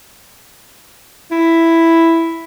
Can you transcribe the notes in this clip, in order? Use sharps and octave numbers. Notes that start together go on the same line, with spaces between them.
E4